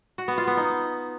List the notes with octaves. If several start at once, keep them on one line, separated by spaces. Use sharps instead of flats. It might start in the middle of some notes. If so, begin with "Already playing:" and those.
F#4
B3
F4
B3
D#4